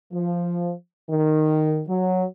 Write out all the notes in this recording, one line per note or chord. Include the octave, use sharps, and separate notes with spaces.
F3
D#3
F#3